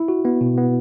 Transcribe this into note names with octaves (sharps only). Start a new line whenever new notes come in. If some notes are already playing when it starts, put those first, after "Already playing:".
Already playing: E4
F#4
B3
B2
B3